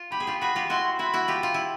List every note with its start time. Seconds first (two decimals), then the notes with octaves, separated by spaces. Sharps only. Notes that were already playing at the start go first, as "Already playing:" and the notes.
Already playing: F4
0.12 G4 B5
0.20 G#4
0.27 F4 G4
0.41 F#4 G#4 B5
0.56 F4 G4
0.70 E4 F#4 C6
0.99 E4 F#4 B5
1.14 E4 F#4
1.28 F4 G4
1.43 F4
1.54 E4